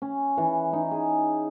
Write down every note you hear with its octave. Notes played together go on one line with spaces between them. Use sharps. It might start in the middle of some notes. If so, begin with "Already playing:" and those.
C#4
E3
D#4
G#4